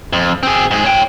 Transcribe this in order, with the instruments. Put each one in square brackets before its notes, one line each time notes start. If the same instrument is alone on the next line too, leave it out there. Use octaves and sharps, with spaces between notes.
[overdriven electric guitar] F2
C4 G#4
G#2 G#4
C#5 G5